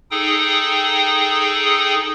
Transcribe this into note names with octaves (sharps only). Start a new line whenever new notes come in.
D#4 G#4 A4 G5 D#6